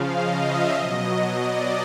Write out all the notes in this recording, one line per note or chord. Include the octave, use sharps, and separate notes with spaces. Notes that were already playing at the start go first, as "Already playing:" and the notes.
Already playing: C#3 F3 F5
D#5
E5
B2 F#3 D#5
D5